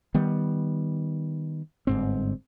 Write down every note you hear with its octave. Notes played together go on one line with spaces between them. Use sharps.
D#3 G3 B3
G1 G#2 C4